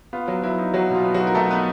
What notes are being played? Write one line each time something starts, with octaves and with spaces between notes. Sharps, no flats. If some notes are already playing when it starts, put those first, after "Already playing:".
B3 F4
F#3
F#3 E4
D#4
F#3 F#4
B2 F4
B3
F#3 F#4
D#4
A#4
A3 D#4 A4
B3 D#4 B4